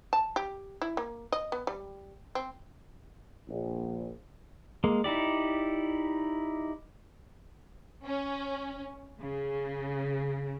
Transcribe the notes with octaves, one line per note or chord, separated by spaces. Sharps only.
A5
G4
E4
A#3
D#5
B3
G3
C4
A#1
G#3 A#3
D#4 E4 G4 D5
C#4
C#3